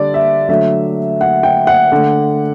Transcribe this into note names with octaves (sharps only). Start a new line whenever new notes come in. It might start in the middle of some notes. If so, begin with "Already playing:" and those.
Already playing: D3 G3 D5
E5
D3 F#3 A3 E5
F#5
G5
F#5
D3 A3